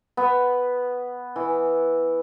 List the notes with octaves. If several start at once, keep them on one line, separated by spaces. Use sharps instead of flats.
B3
E3